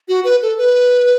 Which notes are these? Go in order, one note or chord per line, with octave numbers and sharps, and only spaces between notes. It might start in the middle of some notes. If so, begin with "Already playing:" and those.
F#4
B4
A4
B4